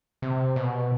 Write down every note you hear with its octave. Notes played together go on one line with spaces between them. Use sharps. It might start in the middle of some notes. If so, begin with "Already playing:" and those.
C3
B2